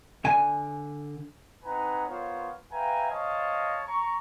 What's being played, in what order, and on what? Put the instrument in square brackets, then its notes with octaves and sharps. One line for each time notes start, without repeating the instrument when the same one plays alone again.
[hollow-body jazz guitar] D3 G#5
[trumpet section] C4 D#4 B4 F#5 G#5 A#5
B3 F4 A#4 C5 C#5
B4 E5 F5 G5 G#5 A#5
C5 C#5 D#5 F5 A5
A#5 C#6